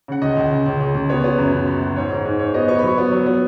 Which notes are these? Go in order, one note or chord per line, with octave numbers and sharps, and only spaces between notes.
C#3 F#5
C#2 D#5
C#2
C#3
C#2
C#2
C#2
B3 C#5
B3
F#2
F#2
F#2
F#2
G#2 C#5
G#2
G#2
G#2 C#5
B3 D#5
B3 C#6
B5
F#3 C#6
B3
F#3
B3